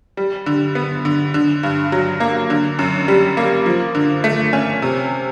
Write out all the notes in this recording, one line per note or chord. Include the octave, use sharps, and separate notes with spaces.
G3
D3
B3
D3
D3
G2
F#3
A#3
D3
F#2
G3
A#3
F3
D3
A3
C#4
C3